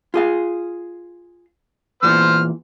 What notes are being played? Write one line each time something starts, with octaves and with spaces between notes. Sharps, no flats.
F4 G#4 F5
E2 A#2 E3 C5 F6